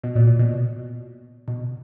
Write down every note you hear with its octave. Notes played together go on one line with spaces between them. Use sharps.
B2
A#2
A#2
B2
B2